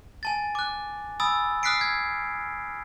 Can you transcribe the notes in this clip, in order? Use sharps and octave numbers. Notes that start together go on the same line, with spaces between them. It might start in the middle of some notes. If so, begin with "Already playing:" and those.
G#5 A5 A6
D6 F#6
G#5 B5 D#6 E6 A6
D#6 F6 F#6 B6 C7 D7
G#6